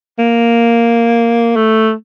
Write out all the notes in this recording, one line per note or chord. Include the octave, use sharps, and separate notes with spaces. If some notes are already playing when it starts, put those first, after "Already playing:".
A#3
A3